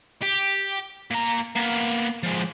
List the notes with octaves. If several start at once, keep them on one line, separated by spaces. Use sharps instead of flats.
G4
A#2 A#5
A#3 B3
F3 G#3